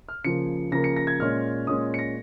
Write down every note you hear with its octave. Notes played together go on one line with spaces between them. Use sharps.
F6
C#3 F3 A#3 C#7
C#3 F3 A#3 A#6
C#7
A#6
G#6
A#2 G#3 C#4 F6
A#2 G#3 C#4 D#6
C#7
A#6